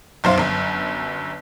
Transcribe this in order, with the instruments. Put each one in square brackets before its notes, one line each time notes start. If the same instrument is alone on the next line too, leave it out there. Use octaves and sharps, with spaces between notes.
[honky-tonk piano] B1 F#2 C5 F5
G1 F#2